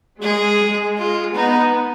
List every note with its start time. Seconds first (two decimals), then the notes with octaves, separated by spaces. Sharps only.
0.21 G#3 G#4
0.60 G#3
0.98 F4
1.35 B3 D#4